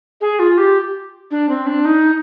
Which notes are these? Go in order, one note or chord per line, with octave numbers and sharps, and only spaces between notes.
G#4
F4
G4
D4
C4
D4
D#4